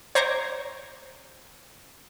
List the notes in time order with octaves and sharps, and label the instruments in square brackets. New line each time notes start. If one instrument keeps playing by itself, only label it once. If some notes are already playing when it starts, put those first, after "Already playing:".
[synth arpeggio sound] C5 C#5 A#5 D6